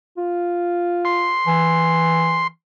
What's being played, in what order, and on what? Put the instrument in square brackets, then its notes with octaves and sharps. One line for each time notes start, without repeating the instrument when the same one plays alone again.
[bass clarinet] F4
[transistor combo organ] C6
[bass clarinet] E3